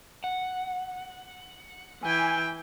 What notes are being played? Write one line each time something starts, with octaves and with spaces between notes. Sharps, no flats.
F#5
E3 G5 G#5